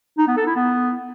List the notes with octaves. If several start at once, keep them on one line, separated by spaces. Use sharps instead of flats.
D#4
B3
A4
E4
B3